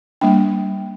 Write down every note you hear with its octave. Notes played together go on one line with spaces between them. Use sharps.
G3 A#3 D4 G5